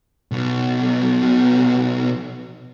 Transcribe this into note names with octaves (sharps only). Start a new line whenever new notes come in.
B1 B2